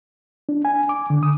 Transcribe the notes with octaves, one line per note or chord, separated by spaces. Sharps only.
D4
G#5
D6
D3
D#6